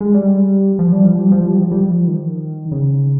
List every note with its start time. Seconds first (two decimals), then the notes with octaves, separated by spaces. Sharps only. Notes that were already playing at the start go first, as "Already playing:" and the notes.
0.01 G#3
0.14 G3
0.79 F3
0.92 G3
1.05 F3
1.18 G3
1.32 F3
1.45 G3
1.58 F3
1.71 G3
1.84 F3
2.07 D#3
2.71 C#3